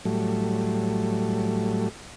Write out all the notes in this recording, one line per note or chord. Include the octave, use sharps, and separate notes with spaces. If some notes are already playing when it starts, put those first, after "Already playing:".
A2 F#3 G3 A3